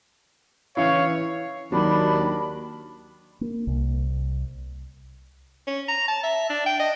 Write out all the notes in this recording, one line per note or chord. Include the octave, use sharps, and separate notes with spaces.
E3 C#4 E4 C#5 F5
D#2 D#3 F#3 D4 B5
A#3
C2
C#4
A#5
A5
E5
D4
G5
D#5